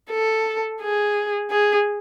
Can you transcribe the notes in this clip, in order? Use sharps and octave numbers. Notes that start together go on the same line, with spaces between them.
A4
G#4
G#4